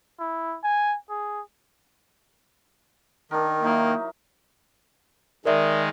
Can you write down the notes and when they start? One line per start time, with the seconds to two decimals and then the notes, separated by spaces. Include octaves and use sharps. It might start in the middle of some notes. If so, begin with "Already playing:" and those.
0.19 E4
0.63 G#5
1.10 G#4
3.31 D#3 D4 A#4
3.63 F#3 A#3 D#4 E4
5.45 D#3 G#3 A#4 D5 E5